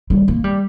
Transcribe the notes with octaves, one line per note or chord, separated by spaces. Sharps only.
G3
A#3
G3